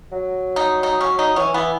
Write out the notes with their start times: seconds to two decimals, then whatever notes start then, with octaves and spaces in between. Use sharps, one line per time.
0.12 F#3
0.56 D#4
0.83 D#4
1.01 C#4
1.19 D#4
1.36 E3 C#4
1.54 E3 B3